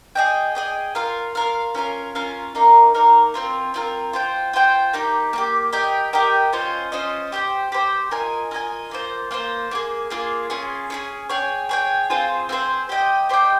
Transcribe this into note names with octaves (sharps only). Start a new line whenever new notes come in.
G#4 D#5 G5
G#4 D#5 G5
F4 A#4 F5
F4 A#4 F5
C#4 F4 A#4 F5
C#4 F4 A#4 F5
A#3 D#4 A#4 F5
A#3 D#4 A#4 F5
C4 F4 A#4
C4 F4 A#4
F4 C5 G5
F4 C5 G5
A#3 D#4 G4
A#3 D#4 G4
G4 A#4 D#5 G5
G4 A#4 D#5 G5
C#4 F4 C5 D#5
C#4 F4 C5 D#5
G4 C5 G5
G4 C5 G5
F4 A#4 D#5 G#5
F4 A#4 D#5 G#5
A#3 F4 C5
A#3 F4 C5
A#3 F4 G#4
A#3 F4 G#4
C#4 F4 G#4
C#4 F4 G#4
G#4 C#5 G5
G#4 C#5 G5
C4 F4 G#4 C5
C4 F4 G#4 C5
G4 C5 D#5 G5
G4 C5 D#5 G5